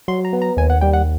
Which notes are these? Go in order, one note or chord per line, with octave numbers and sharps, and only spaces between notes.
F#3 C6
A#5
B3
A#5
D#2 G#5
F#5
G3 G5
F#5